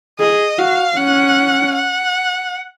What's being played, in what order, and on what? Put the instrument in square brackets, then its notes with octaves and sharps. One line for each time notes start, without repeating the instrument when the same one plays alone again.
[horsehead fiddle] G#4 [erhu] D#5
[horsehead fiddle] F#4 [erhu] F5
[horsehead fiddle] C#4 [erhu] F#5
[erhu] F#5